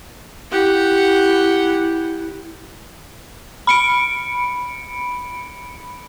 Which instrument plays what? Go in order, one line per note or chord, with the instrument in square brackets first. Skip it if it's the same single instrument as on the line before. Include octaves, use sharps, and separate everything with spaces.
[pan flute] E4 [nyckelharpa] G4 F#5
[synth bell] B5 C#7 D7